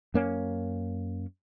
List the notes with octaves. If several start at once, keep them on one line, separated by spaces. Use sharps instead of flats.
F#2 A#3 C#4